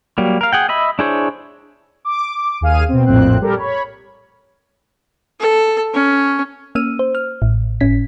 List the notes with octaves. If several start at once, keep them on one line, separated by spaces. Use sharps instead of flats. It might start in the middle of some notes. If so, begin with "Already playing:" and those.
F#3 G3 A#3
A#4 F5
G#4 F#5 G5
D#5 E5 B5
D4 E4 G#4 C5 C#5
D6
D#2 G#4 F5 F6 D#7
B2 C4
A#1 F2 A2 C4 F#6
G3 G4 A4 A#4 D5
C#5 B5
A4
C#4
A#3 C#4 E6 F6 D#7
C5
F6
A1 A2
G1 A2 C#4 B6